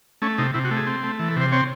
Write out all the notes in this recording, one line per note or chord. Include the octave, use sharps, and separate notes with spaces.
A3 C#4
C3 D#4
C3 E4
F#4
A3
G#4
C4
A3
E3
A4
C3
C5
C4 C#5